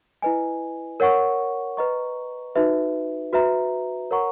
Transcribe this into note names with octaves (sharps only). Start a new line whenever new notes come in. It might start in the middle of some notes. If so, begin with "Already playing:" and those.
E4 B4 D#5 G#5
A#4 C#5 F#5 C#6
B4 D#5 A#5 C#6
D#4 F#4 B4 E5
F#4 B4 E5 A#5
A#4 C#5 F#5 A#5 C#6